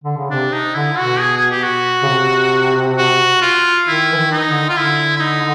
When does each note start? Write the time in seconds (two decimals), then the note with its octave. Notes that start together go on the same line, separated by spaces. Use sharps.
0.04 D3
0.17 C#3
0.30 C3 D4
0.53 D#4
0.74 D3 E4
0.97 B2 F#4
1.20 G#4
1.37 G#4
1.51 G4
1.63 F#4
2.03 C#3
2.08 C3
2.98 F#4
3.42 F4
3.87 D#3 E4
4.12 E3
4.17 D#3
4.31 D#4
4.47 D3
4.69 F4
4.76 D3 E4
5.16 E4
5.20 D#4